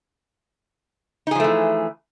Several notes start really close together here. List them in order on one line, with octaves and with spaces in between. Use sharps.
D#4 G#4 F3 A3 E3